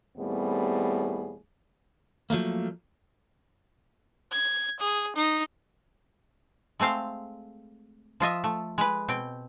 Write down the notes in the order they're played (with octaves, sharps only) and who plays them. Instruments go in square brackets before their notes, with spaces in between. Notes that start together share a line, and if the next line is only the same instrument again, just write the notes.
[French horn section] D#2 A2 G3 B3 C4 G#4
[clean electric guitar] F3 F#3 A3 A#3
[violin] G#6
G#4
D#4
[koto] G#3 A3 C4 C5 F5
F3 F4 D#5 E5
A3
G#3 B4
B2 C4 G5